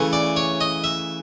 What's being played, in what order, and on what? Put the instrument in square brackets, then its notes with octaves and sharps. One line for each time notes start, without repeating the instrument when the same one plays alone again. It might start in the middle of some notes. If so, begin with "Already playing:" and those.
Already playing: [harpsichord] C#3 E3 A3
D5
C#5
D#5
E5